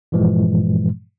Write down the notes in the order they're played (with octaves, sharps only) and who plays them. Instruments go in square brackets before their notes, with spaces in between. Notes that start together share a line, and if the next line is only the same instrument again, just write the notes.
[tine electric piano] G2 A#2 E3 F3 G#3